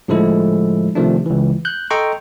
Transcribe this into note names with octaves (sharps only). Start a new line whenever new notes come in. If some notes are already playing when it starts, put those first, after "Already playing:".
A2 D3 F3 G#3 E4 A4
C3 D#3 F3 A3 D4
C#2 E3
F#6 G6
A4 D#5 G5 A#5 C6 C#6